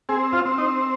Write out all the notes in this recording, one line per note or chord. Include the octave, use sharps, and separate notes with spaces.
C4 G#4
F4
C4
D#4